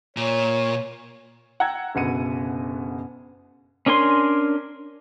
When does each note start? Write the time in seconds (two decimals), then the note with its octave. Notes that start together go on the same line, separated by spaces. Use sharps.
0.17 A#2 C#5
1.60 F#5 G5 A#5 E6 G#6
1.95 F#1 B2 D3 C#7 D#7
3.86 C#4 D4 A#4 G#5 C6